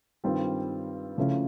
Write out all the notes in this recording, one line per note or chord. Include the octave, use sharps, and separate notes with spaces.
G2 D#3 G3 C4 F4
C#3 F3 A3 C#4 E4